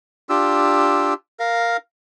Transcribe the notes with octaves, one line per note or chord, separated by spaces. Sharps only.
D4 F4 G4 E6
A#4 F5